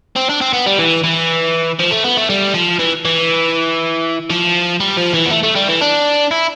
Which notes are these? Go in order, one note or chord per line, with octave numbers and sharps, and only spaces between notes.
C4
D4
C4
B3
G3
E3
E3
F3
A3
B3
A3
G3
F3
E3
E3
F3
G3
F3
E3
B3
A3
A3
G3
E3
D4
E4